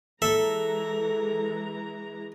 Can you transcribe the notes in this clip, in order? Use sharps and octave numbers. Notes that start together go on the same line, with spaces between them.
E3 G#3 A4 E5 A#5